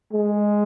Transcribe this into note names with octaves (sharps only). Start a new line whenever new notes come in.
G#3